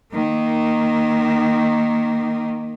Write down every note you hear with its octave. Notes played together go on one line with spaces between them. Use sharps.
D#3 A#3